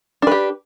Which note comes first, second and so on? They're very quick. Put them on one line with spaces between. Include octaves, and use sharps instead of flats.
D4 B4 G4